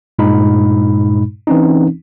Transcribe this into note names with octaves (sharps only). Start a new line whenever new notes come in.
G2 A#2 G#3 D#4 B5
E3 C4 C#4 D#4